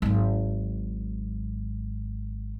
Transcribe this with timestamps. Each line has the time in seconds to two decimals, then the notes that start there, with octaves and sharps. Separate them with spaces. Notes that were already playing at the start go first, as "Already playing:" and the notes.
0.02 G#1 F#3